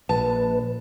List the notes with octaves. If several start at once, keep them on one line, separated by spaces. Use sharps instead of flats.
A#1 B4 A5